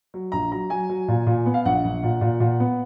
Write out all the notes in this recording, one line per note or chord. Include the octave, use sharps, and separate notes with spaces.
F#3
A#1 A#5
F#3 A#5
F#3 G#5
F#3
A#2
A#2
B3
F5
A#1 F#5
A#1
A#2
A#2
A#2
B3